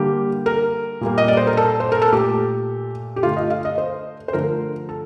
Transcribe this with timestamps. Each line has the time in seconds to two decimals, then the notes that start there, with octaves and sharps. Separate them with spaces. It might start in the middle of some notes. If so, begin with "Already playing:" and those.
Already playing: D3 G3 A#3 G4
0.46 A#4
1.01 A#2 G3 A#3
1.18 D#5
1.28 D5
1.37 C5
1.47 A#4
1.57 A4
1.80 C5
1.92 A#4
2.02 A4
2.12 A#2 A3 G4
3.16 G4
3.23 D3 A3 F4
3.37 D#5
3.50 F5
3.65 D#5
3.78 C5
4.28 C5
4.33 D3 F3 A3 A#4
4.89 A4